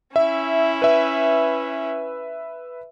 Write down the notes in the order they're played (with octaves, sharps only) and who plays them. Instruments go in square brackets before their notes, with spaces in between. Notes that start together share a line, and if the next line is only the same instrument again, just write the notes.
[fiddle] C#4 E4 [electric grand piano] E5
[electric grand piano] B4 E5